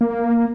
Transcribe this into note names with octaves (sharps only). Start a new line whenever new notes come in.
A#3